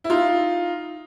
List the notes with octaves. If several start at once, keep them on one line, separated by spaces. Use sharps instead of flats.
E4
D#4 F4